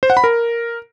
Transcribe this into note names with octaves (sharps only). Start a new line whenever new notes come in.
C5
F#5
B5
A#4